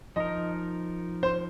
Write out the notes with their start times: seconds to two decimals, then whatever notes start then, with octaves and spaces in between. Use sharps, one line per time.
0.16 F3 D#4 A#4 D#5
1.23 C5